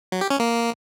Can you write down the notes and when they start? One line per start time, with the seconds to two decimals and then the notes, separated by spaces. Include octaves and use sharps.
0.12 F#3
0.21 G4
0.30 C#4
0.40 A#3